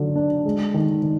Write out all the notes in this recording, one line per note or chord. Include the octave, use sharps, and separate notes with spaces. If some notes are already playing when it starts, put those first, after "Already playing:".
Already playing: D3 F#3
D4
G#3
D#3
D#3